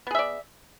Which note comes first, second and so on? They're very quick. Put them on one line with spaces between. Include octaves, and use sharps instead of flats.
B3 G#4 E5 D5